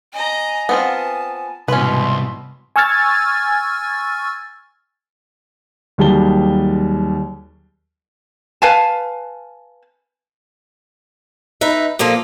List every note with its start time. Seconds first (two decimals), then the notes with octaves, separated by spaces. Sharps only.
0.13 D#5 G#5 A#5
0.69 B3 C4 F4 A5
1.68 C2 G#2 B2 E3 C#4 B4 C6
2.76 G#5 C#6 E6 F6 G#6 A6
5.98 D#2 F#3 G3 G#4 A5 G7
8.62 B4 F5 G#5 A5
11.61 D#4 B4 E5
11.99 A#2 F3 A#3 F4 A4